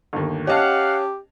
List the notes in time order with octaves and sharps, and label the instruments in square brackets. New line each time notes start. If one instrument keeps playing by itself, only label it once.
[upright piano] G1 D#2
[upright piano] C#4 D#5 A5 [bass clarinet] G4 [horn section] F5 F#5